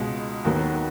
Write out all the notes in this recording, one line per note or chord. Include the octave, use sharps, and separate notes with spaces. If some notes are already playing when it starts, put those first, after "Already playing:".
Already playing: C#2 B2 G#3
D#2 D#3 F#3 B3